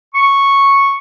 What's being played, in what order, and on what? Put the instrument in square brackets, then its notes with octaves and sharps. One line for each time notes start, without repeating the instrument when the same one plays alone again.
[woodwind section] C#6